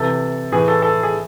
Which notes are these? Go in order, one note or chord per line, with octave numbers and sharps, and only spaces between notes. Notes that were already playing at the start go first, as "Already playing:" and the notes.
Already playing: C3 E3 A4
A2 E3 G#4
A4
A4
G#4